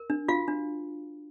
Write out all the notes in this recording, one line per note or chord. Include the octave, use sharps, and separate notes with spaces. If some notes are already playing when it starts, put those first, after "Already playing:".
Already playing: A#4
D4
F4 F#4 F5
D4